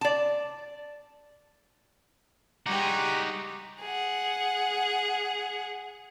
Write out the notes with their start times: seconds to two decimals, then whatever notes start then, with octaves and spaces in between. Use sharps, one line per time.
0.01 D5 A5
2.66 G3 G#3 D#4 F#4 G4 A#5 D6 F#6
3.80 G#4 F#5